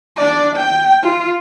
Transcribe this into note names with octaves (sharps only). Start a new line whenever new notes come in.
D4 D5
G5
F4